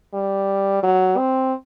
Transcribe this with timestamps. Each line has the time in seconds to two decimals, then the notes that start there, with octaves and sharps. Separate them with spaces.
0.14 G3
0.83 F#3
1.17 C4